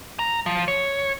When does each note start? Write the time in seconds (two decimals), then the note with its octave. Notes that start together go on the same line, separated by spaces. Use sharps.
0.19 A#5
0.46 F3
0.68 C#5